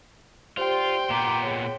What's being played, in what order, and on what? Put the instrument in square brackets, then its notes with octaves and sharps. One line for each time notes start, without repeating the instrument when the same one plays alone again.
[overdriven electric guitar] F4 [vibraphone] G4 C5 D5 [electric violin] G5 C6
[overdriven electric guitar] A#2 B3 [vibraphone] A#5 D6
[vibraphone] G#4 C#5